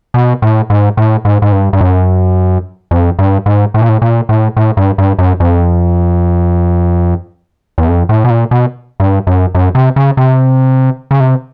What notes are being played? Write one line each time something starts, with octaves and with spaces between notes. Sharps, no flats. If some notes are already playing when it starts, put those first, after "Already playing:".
B2
A2
G#2
A2
G#2
G#2
G2
G2
F#2
F2
G2
G#2
A2
A#2
A2
A#2
A2
A2
G2
G2
F#2
F2
E2
F2
A2
B2
A#2
B2
G2
F#2
F#2
C3
C#3
C3
C#3
C3